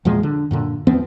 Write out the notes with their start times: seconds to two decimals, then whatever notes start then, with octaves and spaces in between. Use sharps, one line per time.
0.05 E2 A#2 F3 G#3
0.23 D3
0.51 F#2 A#2 D3
0.87 E2 F3 B3 C4